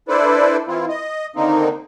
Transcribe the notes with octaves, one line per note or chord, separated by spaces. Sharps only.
D4 E4 A4 B4 C5 D5
E3 C4 E4 F4
D#5
D3 D#3 A#3 C4 D#4